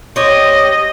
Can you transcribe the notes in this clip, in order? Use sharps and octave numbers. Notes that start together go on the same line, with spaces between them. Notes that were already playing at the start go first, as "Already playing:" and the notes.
G4 C5 C#5 D#5